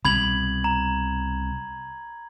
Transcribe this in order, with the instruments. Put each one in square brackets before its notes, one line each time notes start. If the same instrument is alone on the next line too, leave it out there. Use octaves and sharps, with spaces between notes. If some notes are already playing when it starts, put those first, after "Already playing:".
[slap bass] C2 B2 [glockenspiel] B5 G#6 F#7
[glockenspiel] A#5